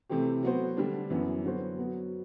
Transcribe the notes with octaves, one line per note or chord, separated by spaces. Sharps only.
C3 E3 A3 C4 G4
F#3 B3 F#4 C5
D3 G3 D4
F#2 E3 B3
D3 F#3 B3 F#4 C5
F#3 B3 F#4